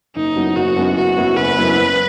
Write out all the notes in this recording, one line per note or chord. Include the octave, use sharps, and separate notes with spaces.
F#1 D#4
F#2 F#3 B3 E4
F#1 F#4
F#2 F#3 B3 E4
F#1 F#4
F#2 F#3 B3 E4
F#1 B4
F#2 F#3 B3 E4
F#2